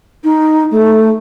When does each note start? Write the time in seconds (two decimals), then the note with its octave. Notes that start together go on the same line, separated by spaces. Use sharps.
0.23 D#4
0.71 A3